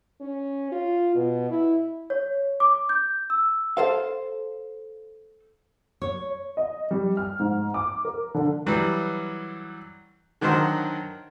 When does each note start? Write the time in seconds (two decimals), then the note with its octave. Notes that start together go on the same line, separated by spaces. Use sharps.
0.21 C#4
0.72 F4
1.15 B2
1.50 E4
2.10 C#5
2.60 D6
2.89 G6
3.30 E6
3.77 A4 C5 F5
6.02 C#5
6.57 D#5
6.91 G3
7.17 F6
7.40 G#2
7.74 D6
8.05 A#4
8.34 D3
8.66 E3 F#3 G3
10.41 D3 D#3 F#3 A#4 C5 F#5